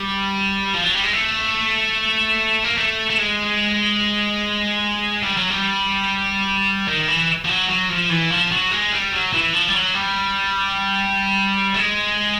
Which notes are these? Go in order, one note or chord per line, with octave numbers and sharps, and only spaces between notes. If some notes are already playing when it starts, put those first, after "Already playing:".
Already playing: G3
F3
F#3
G3
G#3
A3
A#3
A3
A3
G#3
G3
F#3
G3
D#3
E3
F3
F#3
F#3
F3
E3
F3
F#3
G#3
G3
F#3
E3
F3
G3
F#3
G3
A3
G#3